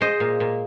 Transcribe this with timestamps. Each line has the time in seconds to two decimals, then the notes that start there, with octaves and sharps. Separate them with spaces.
0.01 G#3 C5 D#5
0.20 A#2
0.40 A#2